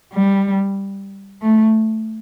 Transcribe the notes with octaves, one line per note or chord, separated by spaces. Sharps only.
G3
A3